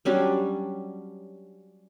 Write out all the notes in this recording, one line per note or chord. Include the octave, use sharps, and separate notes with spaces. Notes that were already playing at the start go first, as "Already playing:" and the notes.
F#3 G3 C#4 D4